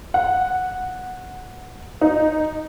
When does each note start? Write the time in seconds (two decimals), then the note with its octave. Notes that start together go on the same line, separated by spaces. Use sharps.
0.14 F#5
2.01 D#4